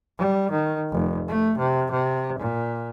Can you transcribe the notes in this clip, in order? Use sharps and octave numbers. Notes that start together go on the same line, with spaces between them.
G3
D#3
F1
A3
C3
C3
A#2